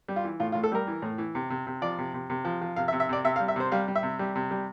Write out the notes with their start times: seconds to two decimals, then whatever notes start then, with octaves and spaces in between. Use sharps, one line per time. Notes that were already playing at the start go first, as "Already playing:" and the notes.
0.08 G3
0.16 F4
0.24 E3
0.40 A2 F4
0.52 F4
0.55 A2
0.63 A4
0.72 G3 A#4
0.87 E3
1.02 A2
1.18 E3
1.35 C3
1.50 C3
1.67 C3
1.82 F3 D5
1.98 C3
2.14 C3
2.30 C3
2.45 F3
2.61 F3
2.76 C3 F5
2.88 E5
2.93 C3
3.00 E5
3.09 C3 D5
3.24 C3 E5
3.36 F5
3.40 G3
3.48 E5
3.56 C3 C5
3.72 G3 F5
3.88 G3
3.96 E5
4.03 C3
4.19 G3
4.36 C3
4.51 G3